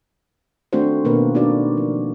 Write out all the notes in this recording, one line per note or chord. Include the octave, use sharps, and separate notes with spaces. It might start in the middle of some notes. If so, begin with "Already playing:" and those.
D#3 A3 C4 D4 F#4 C5
B2 D#3 A#3 D4 A#4 B4
D4 D#4 F4 F#4 A#4 D5
F3